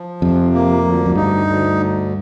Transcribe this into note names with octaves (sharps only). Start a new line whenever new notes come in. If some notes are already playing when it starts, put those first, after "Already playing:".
Already playing: F3
F2 C3
A#3
D2
F2
G2 D#4
D2